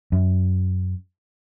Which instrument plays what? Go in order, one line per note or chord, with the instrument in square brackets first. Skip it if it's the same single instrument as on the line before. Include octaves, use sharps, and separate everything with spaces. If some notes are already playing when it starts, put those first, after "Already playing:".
[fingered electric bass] F#2